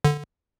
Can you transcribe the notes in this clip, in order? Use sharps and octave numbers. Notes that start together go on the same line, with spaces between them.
D3